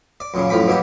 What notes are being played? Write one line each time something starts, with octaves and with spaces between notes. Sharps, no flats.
D5
F#2 A#2 C#3
F#2 A2 F3 B5 D6
B2 F#3 A#3 G4